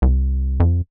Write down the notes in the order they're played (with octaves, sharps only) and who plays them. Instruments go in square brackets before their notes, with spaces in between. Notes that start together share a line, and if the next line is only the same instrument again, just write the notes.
[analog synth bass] C2
F2